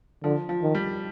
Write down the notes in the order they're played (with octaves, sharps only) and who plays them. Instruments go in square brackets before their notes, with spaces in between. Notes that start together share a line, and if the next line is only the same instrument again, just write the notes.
[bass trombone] D3 [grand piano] F3
[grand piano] F3
[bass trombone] D#3
[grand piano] G3